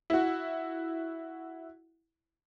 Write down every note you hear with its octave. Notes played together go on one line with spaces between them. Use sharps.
E4 F#4